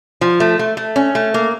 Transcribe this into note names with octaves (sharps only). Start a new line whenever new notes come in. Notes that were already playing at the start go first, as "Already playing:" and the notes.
F3
A3
A3
A3
C#4
A3
A#3